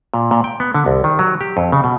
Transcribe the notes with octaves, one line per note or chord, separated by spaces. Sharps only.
A#2
A#2
G5
B3
D3
C2
D#3
F#3
G4
F2
C#3
B2